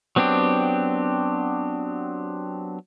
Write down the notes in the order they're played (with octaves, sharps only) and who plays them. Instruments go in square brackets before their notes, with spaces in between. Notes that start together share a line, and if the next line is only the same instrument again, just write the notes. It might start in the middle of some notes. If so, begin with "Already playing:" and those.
[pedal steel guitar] F#3 B3 C4 D4 G4